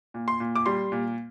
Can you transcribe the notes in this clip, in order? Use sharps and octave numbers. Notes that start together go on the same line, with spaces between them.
A#2
C6
A#2
D6
G3 C6
A#2